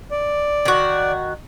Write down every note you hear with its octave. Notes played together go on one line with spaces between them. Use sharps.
D5
D#3 F#4